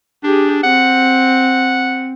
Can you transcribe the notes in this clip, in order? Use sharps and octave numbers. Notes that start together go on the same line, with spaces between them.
D4 G4 G#4
C4 F#5